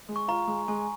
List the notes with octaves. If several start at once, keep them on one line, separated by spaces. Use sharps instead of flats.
G#3
C#6
F4 A#5
G#3
G#3 G#5